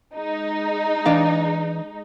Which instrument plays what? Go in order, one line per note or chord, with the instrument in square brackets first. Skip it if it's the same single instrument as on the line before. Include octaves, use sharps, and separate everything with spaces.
[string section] G#3 D#4
[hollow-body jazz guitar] E3 D4 F5